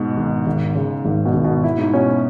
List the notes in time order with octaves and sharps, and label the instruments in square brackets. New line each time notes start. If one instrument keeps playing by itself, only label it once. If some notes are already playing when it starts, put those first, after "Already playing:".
Already playing: [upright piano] G#2 B2
[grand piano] G#1
G#1
C#3
[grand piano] G#1 [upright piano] G#2
[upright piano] B2
[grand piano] G#1
[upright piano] B2
[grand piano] E4
[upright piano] G#2
[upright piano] B2 [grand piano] C#4